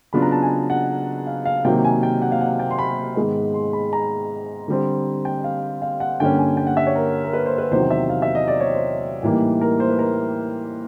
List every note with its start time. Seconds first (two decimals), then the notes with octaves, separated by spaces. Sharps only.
0.13 C#3 F#3 B3 D4 F4 B5
0.22 A#5
0.32 A5
0.42 G#5
0.70 F#5
1.27 F5
1.45 F5
1.65 C3 D#3 F#3 A#3 G5
1.84 G#5
2.03 G5
2.22 F#5
2.32 F5
2.41 F#5
2.60 G5
2.71 C6
2.79 B5
3.16 G#2 D#3 G#3 B3
3.54 C6
3.73 B5
3.93 A#5
4.68 D3 G3 C4
5.25 G5
5.44 F5
5.82 F5
6.00 F#5
6.20 G2 D3 G3 A#3 C#4 G5
6.39 G#5
6.57 G5
6.67 F#5
6.77 E5
6.87 C#5
6.96 A#4
7.24 A#4
7.33 B4
7.46 C5
7.58 B4
7.71 E2 C3 D#3 F#3 C5
7.91 E5
8.10 F5
8.22 E5
8.35 D#5
8.48 D5
8.60 C#5
8.73 C5
9.23 A2 E3 G3 A#3 D#4
9.61 A#4
9.80 C5
9.89 B4
9.99 A#4